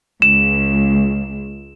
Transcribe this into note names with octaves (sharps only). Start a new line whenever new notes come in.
C#2 E7